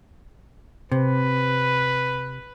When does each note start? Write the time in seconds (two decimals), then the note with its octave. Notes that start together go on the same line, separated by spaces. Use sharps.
0.92 C3 B4